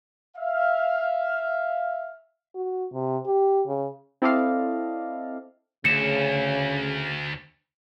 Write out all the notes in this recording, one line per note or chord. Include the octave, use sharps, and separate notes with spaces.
E5 F5
F#4
C3
G4
C#3
C4 E4 A4 D5 D#5 F5
D2 C#3 C#7 E7